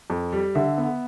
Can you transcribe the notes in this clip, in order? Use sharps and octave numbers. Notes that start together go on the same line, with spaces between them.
F2
G3
D3 E5
B3